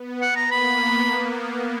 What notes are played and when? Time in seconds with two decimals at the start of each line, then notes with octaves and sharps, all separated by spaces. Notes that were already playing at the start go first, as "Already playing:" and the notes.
Already playing: B3
0.22 F#5
0.36 A#5
0.51 A#3 B5